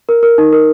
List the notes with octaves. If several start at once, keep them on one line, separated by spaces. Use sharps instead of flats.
A#4
A#4
D#4
A#4